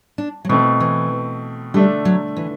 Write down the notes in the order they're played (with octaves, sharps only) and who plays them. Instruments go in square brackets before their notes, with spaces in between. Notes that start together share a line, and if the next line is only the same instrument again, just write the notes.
[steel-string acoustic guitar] D4
F#3
[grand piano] B2 A3 C4 [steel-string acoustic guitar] E3
[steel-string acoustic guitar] E3
[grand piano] D3 A3 D4 [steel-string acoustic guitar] G3
[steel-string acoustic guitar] F#3
E3